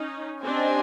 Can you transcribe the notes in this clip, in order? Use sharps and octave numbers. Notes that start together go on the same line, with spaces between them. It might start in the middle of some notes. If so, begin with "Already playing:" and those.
Already playing: C#4 D#4
C4 D4 G4 C5 D#5 G#5